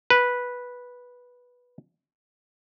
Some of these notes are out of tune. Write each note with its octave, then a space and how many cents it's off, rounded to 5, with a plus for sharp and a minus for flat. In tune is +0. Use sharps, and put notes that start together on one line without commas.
B4 -10